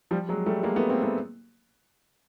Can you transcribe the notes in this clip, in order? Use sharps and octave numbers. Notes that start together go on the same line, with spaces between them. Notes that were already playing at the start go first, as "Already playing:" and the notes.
F3 G3
F#3 G#3
G3 A3
G#3 A#3
A3 B3
A#3 C4
A3 B3